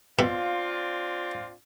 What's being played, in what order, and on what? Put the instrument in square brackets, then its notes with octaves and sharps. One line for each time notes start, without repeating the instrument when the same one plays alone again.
[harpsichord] B2 [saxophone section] C4 D4 F4